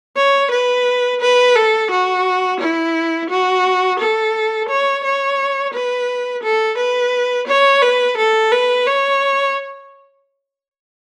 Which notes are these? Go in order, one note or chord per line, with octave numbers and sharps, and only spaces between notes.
C#5
B4
B4
A4
F#4
E4
F#4
A4
C#5
C#5
B4
A4
B4
C#5
B4
A4
B4
C#5